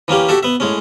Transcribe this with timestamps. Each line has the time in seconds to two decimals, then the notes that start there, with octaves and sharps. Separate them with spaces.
0.08 E3 A#3 C#4 G4
0.28 F#4 G4 A4 E5
0.43 B3 E5
0.60 A2 G#3 C#4